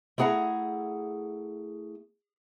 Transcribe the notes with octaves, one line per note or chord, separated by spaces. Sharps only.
A3 E4 G#4 F#5 A#5